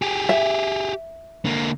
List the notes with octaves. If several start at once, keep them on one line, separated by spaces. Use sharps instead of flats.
G4 G#4
E5
D3 A#3